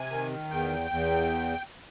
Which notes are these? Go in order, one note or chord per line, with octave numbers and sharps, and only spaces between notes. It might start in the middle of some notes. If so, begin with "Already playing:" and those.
Already playing: C3 G#5
D#3
E2 G5
E2